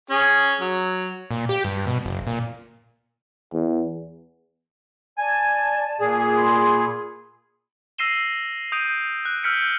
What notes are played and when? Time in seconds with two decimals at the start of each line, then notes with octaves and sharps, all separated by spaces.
0.10 C#4 G#4
0.61 F#3
1.31 A#2
1.49 G4
1.64 G2
1.87 B2
2.05 F#1
2.27 A#2
3.53 E2
5.18 D5 G#5 A5
6.00 A#2 G#4
6.35 B5 C6
7.98 E6 A#6 C7 D#7 E7 G7
8.72 D#6 G6 D7 D#7
9.25 F#6
9.43 E6 F6 G6 B6 C#7 D7